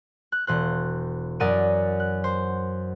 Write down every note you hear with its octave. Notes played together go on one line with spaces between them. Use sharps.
F#6
E1 C5 F#6
F#2 A#4 D5 F#5 D#6 D#7
F#6
C5